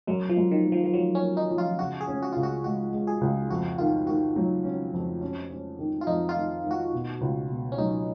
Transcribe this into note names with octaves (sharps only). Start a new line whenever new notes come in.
F#2 F#3
F3
F#2
D#3
A#3
F3
F3
F#3 F4
C#4
A#3
D#4
F3
F4
C#3 F#4
G#4
C#4
F#4
C#2 F4
F#4
G#3 F#4
G#3
G#4
C#2
F2 F#4
D#3 F4
D#3 F#4
F#3
C#4
F2
C#4
C#4
D#3
F4
F2 D#4
F4
D#3
D#3
F#4
B2
C#2
B2
C#4
F#3 D#4